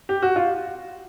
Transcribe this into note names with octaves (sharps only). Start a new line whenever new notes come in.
G4
F#4
F4